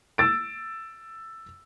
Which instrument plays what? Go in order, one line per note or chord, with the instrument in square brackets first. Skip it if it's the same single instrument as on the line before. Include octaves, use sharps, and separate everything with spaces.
[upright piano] E6 A6 D7